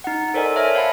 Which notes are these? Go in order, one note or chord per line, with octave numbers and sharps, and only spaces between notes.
D#4 F#5
A4 A#4 C5 D5 D#5 G#5
C#5 E5 G#5 A5 F6 A#6
C5 F5 F#5 A5 B5